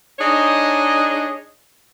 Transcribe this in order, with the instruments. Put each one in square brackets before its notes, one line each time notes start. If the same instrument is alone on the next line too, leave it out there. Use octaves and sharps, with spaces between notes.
[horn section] D4 D#4 G#4 C#5 D#5